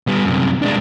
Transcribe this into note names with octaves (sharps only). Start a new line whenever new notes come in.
G3 B3
F#2 C3
G#3 D4